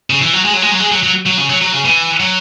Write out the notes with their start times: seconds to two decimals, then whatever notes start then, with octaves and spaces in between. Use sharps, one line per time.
0.10 C#3
0.22 E3
0.33 F#3
0.45 G#3
0.53 F#3
0.62 G#3
0.71 F#3
0.80 G#3
0.92 F#3
1.03 F#3
1.26 F#3
1.38 C#3
1.50 F#3
1.61 F#3
1.73 C#3
1.85 E3
2.20 F#3